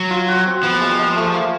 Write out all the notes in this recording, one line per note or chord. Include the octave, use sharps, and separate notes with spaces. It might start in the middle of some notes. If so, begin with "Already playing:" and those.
Already playing: F#3
F4
F#4
C4
F3 B3
A#3
G#3
G3
G#3
A3
A#3